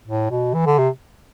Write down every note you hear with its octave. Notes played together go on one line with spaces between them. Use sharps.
A2
B2
E3
D3
C3